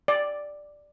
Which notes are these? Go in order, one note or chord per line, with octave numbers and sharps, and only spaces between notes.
D5